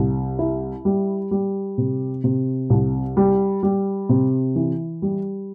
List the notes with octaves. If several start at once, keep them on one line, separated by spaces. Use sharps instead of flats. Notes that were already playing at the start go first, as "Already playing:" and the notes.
Already playing: C2
E4
G3
G3
C3
C3
C2
G3
G3
C3
E3
G3